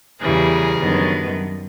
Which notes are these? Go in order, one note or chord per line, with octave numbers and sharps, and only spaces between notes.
E2 C#3 E3 G3 G#4 A#4
F#2 D#3 G3 B3 D4